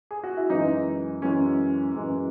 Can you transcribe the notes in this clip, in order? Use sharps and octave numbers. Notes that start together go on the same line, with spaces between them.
G#4
F#4
E4
F#2 E3 G#3 D#4
F#2 E3 G#3 C#4
F#2 E3 G#3